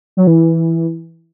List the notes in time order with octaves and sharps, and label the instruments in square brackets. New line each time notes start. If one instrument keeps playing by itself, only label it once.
[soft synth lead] F#3
E3